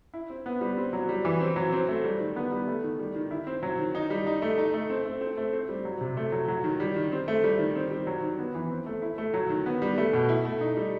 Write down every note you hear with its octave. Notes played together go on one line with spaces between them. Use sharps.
E4
C4
B3
G3
C4
F#3
G3
E3
C4
F#3
C4
A3
G3
D#3
B3
G3
A3
D#3
G3
D#3
E4
C4
F#3
D#3
D#4
G3
D#4
A3
D#4
A3
C4
A3
C4
A3
C4
G3
F#3
C3
A3
F#3
F#3
D#3
G3
D#3
C4
A3
G3
D#3
C4
G3
F#3
D#3
B3
E3
C4
A3
E4
A3
F#3
D#3
B3
G3
A3
B2
E4
A3
D#4
G3